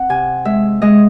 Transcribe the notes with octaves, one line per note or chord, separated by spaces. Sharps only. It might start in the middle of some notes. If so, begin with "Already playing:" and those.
Already playing: C4 F#5
C3 G#5
G#3 E5
G#3 D#5